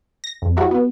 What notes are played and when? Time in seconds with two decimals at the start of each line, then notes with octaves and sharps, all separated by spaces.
0.24 A#6
0.42 F2
0.57 F#3 E4 F#4 G4
0.71 B3